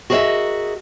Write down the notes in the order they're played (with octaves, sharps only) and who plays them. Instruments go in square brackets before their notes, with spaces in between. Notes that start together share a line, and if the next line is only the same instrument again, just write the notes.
[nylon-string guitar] F#4 G#4 A#4 B4 D#5 E5